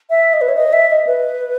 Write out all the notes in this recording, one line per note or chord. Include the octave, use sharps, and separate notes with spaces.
E5
D#5
B4
C#5
D#5
E5
D#5
B4